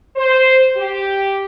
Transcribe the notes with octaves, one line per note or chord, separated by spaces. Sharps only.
C5
G4